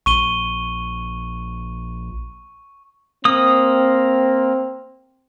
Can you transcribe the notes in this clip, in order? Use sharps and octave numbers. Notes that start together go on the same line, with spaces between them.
A#1 C#6 D#7 G7
A#3 C4 D#6